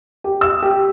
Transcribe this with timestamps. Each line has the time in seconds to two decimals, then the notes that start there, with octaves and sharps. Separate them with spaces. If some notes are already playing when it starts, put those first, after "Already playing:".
0.24 G4
0.41 E6
0.62 G4